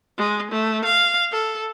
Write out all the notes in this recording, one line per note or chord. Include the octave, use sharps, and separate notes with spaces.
G#3
A3
F5
A4